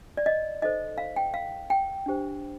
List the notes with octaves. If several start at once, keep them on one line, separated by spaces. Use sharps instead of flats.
D5
D#5
D#4 A4 C5 D#5
F5
G5
F5
G5
D4 G4 C5